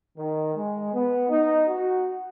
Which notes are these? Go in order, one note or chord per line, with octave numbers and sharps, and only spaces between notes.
D#3
G#3
B3
D#4
F#4